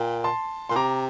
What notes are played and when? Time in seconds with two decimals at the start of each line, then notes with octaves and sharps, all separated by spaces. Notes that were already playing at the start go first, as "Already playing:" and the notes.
Already playing: A#2 G5
0.24 A5 C6
0.69 A#2 C6
0.76 C3 A#5 D6